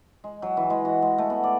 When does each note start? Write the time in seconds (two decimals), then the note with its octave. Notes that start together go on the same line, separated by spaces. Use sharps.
0.24 G#3
0.42 F#3
0.57 E3
0.70 G#3
0.85 F#4
1.02 G#3
1.18 A3
1.30 B3
1.44 D5